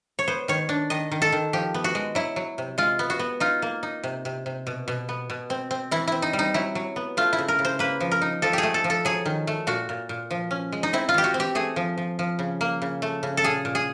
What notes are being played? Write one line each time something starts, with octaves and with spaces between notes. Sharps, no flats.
C#5
B3 C5
D#3 C#5
D4
D#3 D#5
D#3
A4
D#3
F3 G4
B3
F#4
G#3
F#3 E4
F#3
C3
G#3 F4
B3
F#4
B3
D#4 F4
A#3
D#4
C3
C3
C3
B2
B2
B3
B2
C4
C4
E3 E4
C4 E4
D#4
G3
D#4
F#3 E4
F#3
B3
A3 F4
E4
C#3
A#4
C#3
C5
A#3 B4
F3
A#4
D#4
F3 A4
G4 G#4
A3
A4
F3
A4
F#3 G#4
D#3
A3
A#2 F#4
A#2
A#2
F3
C#4
G#3
D#4
C4 E4
F4
E3 G4
F#4
C4
G4
A3 G#4
F3
F3
F3
C#3
A#3
C#3
A3
C#3
A4
A#2 G#4
A#2
G#4